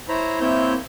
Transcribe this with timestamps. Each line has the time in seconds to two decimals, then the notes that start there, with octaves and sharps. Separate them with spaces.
0.09 E4 C5 C#5 A#5 B5
0.41 A#3 C4 E4 C#5 E5 G6